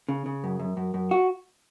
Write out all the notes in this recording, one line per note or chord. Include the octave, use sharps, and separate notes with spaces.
C#3
C#3
F#2
F#2
F#2
F#2
F#4